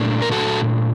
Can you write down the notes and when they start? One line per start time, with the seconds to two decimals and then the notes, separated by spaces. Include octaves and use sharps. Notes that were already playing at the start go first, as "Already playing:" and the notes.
Already playing: A#2 A3 D4
0.22 A#4
0.32 F#4 A4